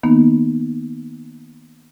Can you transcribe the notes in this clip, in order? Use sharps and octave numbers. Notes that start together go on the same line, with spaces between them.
D#3 A#3 B3 D#4